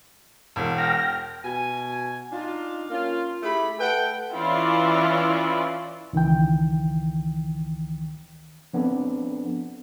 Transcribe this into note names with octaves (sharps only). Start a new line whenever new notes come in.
E1
G5 F6 A#6
B2 G#5
D4 D#4 F4
A#3 C#4 F4
A3 E4 G4 G#4 B5
A3 A4 B4 F#5 G5
E3 C#4 E4 F4 D5
C#2 D#3 E3 G5
F3 B3 C4 D4 A4